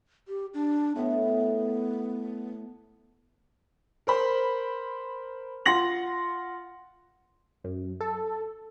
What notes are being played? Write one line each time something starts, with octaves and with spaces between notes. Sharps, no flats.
G4
D4
A2 B3
A#4 C5 B5
F4 F#5 C6 A#6 F#7
F#2
A4